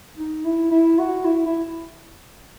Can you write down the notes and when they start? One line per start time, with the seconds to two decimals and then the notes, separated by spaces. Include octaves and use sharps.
0.17 D#4
0.45 E4
0.71 E4
0.99 F#4
1.25 E4
1.46 E4